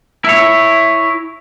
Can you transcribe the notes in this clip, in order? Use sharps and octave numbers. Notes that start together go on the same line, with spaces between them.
E4 C#5